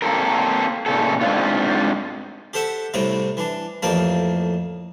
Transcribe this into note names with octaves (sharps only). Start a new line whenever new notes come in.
A#3 C4 D#4 E4 A4 A#4
A#2 C#3 A4
G#2 B2 C4 D4 F4
G4 A4 C5 E5 F#5
C2 A2 C3 C4 A#5
E3 D4
A1 F2 A#3 C4 A#4 A5